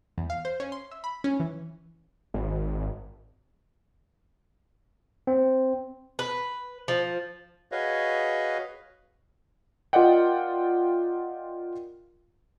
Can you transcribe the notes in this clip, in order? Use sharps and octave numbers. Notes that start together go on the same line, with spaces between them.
E2
F5
C5
C#4
C6
E5
B5
C#4
E3
G#1
C4
B4
F3
F#4 G#4 B4 C#5 D#5 F5
F4 A#4 D5 D#5 F#5 G5